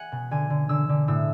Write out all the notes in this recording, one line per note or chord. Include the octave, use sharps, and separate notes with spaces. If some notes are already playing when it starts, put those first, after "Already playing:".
Already playing: F#5 G#5
B2
D3 G#5
D3
D3 E6
D3
A2 E6